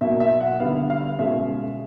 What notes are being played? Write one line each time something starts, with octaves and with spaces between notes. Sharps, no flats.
B2 F#3 A#3 E5
E5
F#5
D3 G3 B3 F5
F5
B2 G#3 C#4 E5